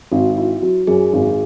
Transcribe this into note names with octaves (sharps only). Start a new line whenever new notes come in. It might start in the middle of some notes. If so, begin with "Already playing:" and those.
G#1 F#4
E4
F#3
F#2 G#4
G#1